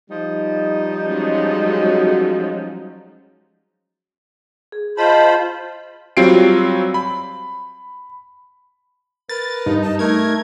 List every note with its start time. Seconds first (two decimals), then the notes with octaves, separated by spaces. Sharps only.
0.10 F3 G3 D#4
1.07 F#3 G#3 C#4
4.72 G#4
4.97 F4 C5 D#5 A5 B5
6.17 F#3 G3 C4 F4 C7 D7
6.94 B5
9.29 A#4 B4 A6
9.66 G2 D#4
9.82 D#5 A5
9.99 A3 A#4 G#6